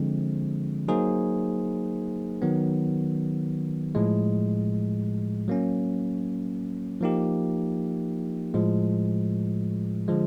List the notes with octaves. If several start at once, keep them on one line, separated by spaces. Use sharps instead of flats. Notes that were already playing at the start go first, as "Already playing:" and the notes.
Already playing: D3 F3 G#3 C4
F#3 A#3 D#4 G#4 C5
D#3 F#3 B3
A2 F3 G#3
F#3 A#3 C#4
F3 A#3 D#4 G4
A2 F3 G#3
D3 F3 G#3